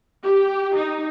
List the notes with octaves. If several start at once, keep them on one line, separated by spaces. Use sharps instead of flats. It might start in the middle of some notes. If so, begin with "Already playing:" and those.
G4
D#4